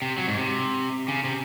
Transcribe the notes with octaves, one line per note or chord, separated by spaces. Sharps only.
C3
F#3
G#2
C3
C#3
C3